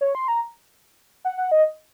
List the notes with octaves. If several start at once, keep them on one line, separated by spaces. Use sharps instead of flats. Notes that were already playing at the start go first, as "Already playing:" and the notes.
C#5
C6
A#5
F#5
F#5
D#5